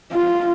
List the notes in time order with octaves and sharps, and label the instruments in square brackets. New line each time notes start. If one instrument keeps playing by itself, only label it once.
[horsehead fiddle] F4